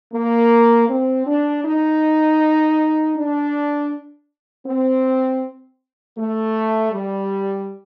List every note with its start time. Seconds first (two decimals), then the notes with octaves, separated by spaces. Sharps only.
0.14 A#3
0.89 C4
1.27 D4
1.65 D#4
3.16 D4
4.67 C4
6.18 A3
6.93 G3